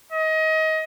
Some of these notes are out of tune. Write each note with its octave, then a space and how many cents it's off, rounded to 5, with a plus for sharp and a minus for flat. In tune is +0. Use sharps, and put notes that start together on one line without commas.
D#5 +25